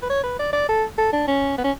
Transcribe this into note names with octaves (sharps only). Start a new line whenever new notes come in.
B4
C#5
B4
D5
D5
A4
A4
D4
C#4
B3
C#4